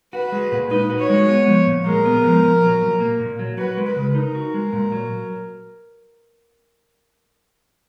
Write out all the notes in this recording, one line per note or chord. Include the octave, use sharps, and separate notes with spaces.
F#4 B4
G#3
A#2
D#4 B4
F#4
C#5
G#3
B3
F3
A#2
G#3 A#4
B3
F3
A#2
F#3
A#2
A#3
A#2
F#3
F#4 B4
G#3
B4
C#3
D#4 A#4
F#4
G#3
A#2
F#3